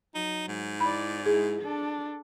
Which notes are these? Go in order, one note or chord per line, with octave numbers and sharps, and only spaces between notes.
F#3 D#4
G#2
E4 D5 B5
G#3 E4 G#4
D4 A4